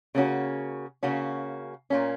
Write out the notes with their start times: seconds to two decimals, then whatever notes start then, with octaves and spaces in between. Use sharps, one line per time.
0.15 C#3 A#3 C#4 F#4
1.03 C#3 A#3 C#4 F#4
1.90 A#2 A#3 C#4